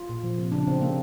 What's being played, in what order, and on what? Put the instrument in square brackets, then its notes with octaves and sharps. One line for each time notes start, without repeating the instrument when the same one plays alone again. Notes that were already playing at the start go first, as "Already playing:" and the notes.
Already playing: [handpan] F4
A#2
F3
C3
C#3 D4
C#3 C4
C3 A#3